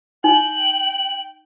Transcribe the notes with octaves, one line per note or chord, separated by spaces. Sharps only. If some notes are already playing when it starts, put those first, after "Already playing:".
D#4 G5 F#7